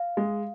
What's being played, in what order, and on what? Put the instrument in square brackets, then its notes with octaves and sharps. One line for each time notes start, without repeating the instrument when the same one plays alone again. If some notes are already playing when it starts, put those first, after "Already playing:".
Already playing: [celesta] F5
[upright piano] G#3